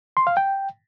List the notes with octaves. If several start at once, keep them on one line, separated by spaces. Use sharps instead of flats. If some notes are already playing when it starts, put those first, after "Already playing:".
C6
F5
G5